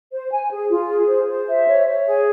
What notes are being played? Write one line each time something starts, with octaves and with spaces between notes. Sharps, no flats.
C5
G#5
G#4
F4
G#4
C5
C5
E5
C#5
C#5
G#4